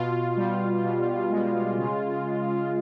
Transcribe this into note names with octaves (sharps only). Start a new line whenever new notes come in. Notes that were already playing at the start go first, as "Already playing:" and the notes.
Already playing: B2 F4
G3
B2
G#3
C#3
C#3